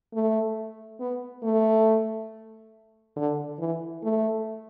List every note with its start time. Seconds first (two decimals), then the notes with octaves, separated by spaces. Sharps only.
0.13 A3
1.00 B3
1.43 A3
3.16 D3
3.59 E3
4.03 A3